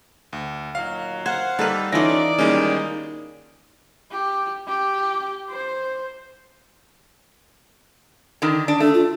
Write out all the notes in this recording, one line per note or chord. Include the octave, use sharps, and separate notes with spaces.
D2
A#2 D#3 F#3 F5
C5 F5 F#5 G#6
G3 A#3 D#4 A4 B4
E3 C#4 D#4 F4 A4 D5 A#6
A#2 D#3 G3 G#3 A#3 C#4 D#4
G4
G4
C5
D3 D#3
D4
A3 D4
F4